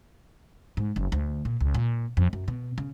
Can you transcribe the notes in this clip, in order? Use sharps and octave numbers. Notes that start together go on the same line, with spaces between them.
G#2
F#1
D2
A#2
C#2
A#2
F2
F#2
B2
C#3